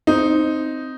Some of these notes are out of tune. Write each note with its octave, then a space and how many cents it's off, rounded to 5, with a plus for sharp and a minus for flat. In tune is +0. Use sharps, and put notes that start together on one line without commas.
C4 +0 D#4 +0